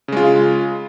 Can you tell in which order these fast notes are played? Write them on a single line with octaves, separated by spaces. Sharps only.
C#3 G#3 F4